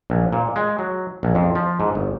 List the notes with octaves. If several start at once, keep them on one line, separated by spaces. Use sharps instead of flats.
A#1
A#2
G#3
F#3
A#1
F2
F3
G#2
G1